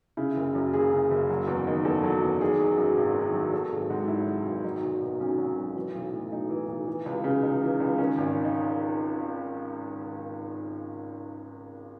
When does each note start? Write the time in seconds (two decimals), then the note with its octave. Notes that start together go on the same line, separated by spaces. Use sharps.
0.17 C#3 E4
0.37 F#1
0.55 F#2
0.73 F#1 G#4
0.93 C#3
1.11 F#1
1.29 F#3
1.47 E2
1.67 D#3
1.85 E2 A4
2.03 F#3
2.22 E2
2.40 D#3 G#4
2.60 F#3
2.78 F#2
2.97 G#1
3.15 D#3
3.34 F#3
3.53 F#3 A4
3.72 G#1 G#4
3.90 G#2 F#4
4.08 G#1 E4
4.27 F#3
4.46 G#1
4.64 F#3 D#4
4.82 B1
4.92 D#4
5.02 B2
5.20 B1 C#4
5.38 F#3
5.57 B1
5.75 E3
5.95 B1
6.13 A2
6.32 B1 D#4
6.50 E3
6.68 B1
6.88 E3
7.06 C#2
7.24 C#3
7.43 C#2 D#4
7.62 E3
7.80 C#2
7.98 D#3 C#4
8.18 G#1
8.45 D#4